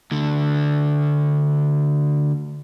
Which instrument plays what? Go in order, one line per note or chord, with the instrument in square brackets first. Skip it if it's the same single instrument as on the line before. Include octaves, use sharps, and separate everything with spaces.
[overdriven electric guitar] D2 D3